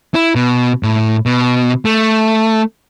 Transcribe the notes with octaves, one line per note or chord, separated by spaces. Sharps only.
E4
B2
A2
B2
A3